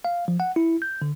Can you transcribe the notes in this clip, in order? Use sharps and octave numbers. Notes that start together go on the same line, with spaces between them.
F5
F3
F#5
E4
G6
D3